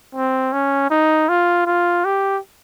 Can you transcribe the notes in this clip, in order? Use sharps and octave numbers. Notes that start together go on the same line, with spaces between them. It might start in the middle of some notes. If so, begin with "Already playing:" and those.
C4
C#4
D#4
F4
F4
G4